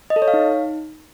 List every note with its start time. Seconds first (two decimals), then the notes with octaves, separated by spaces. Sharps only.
0.10 D#5
0.16 A4
0.22 C#5
0.28 F5
0.34 D#4